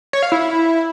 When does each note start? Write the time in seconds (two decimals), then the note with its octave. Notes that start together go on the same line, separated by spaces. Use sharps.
0.13 C#5
0.23 F5
0.32 E4